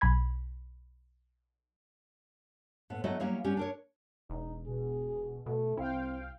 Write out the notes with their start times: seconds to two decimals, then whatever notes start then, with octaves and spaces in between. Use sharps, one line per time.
0.01 B1 G#5 B5 G#6
2.90 A2 B3
3.04 F#3 A3 B3 E4 F#4 D#5
3.20 F#3 G3 A#3 B3 C#4 E4
3.44 G3 B3 C#4 G4
3.57 D4 A#4 C#5
4.30 E1 D#4
4.67 B2 G#4
5.46 B2 A3
5.77 C2 C4 E4 F5 G5